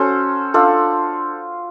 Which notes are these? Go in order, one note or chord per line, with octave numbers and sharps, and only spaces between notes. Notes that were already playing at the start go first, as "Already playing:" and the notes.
Already playing: C#4 F#4 A4 C5
D4 F4 A4